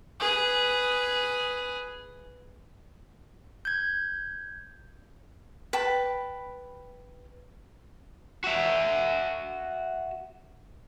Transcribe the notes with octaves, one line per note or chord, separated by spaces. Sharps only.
G#4 B4
G6 G#6
B4 G5 A5 B5
F#4 E5